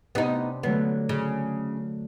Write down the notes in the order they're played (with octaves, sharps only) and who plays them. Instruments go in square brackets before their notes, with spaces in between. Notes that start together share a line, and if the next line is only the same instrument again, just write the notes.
[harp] C3 D4 D#6 [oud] B3 D#4
[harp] D3 F#3 A3 [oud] B3
[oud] C#3